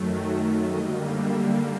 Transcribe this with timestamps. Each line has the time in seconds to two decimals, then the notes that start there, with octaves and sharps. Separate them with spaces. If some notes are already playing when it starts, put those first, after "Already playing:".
Already playing: F#2 D#3 F#3 A3
0.15 D#5
0.63 D3 G3 A#3 D#5
1.12 E5